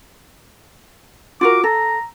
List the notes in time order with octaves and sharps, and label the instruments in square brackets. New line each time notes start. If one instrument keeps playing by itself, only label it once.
[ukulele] F4 F#4 A#4 [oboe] D6
[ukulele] A4 [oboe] A#5